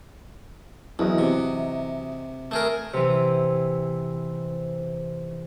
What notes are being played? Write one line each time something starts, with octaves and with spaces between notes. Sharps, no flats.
E2 E3 F#3 D#5
C3
A3 G#4 A#4
C3 E3